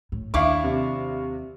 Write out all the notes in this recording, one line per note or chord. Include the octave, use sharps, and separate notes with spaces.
A2
D#2 D4 E4 F5 C#6
C3